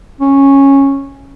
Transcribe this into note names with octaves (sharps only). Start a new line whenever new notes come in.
C#4